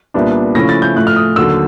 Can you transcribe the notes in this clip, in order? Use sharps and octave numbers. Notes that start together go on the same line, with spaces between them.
C2 A#2 G3 B3 D4
C#3 F3 A3 C#4 E4 A#6
A6
G6
A2 F3 A3 F#6
F6
D#6
D#2 D3 F#3 E6